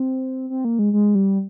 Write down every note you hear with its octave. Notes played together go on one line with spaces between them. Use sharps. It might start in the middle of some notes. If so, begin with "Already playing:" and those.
Already playing: C4
C4
A#3
G#3
G#3
G3